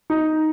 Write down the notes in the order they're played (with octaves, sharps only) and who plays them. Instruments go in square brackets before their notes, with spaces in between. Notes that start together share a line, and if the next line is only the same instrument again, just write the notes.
[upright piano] D#4